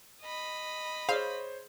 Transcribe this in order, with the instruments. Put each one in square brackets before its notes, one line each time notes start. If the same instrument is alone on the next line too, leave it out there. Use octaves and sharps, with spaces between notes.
[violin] D#5 B5
[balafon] G#4 [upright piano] C5 C#5 [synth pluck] F5